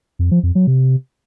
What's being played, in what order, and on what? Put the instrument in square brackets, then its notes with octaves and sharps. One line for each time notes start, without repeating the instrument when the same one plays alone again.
[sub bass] F2
F3
F2
F#3
C3